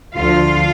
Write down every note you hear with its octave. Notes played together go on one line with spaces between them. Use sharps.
D2 D3 F3 F4 F5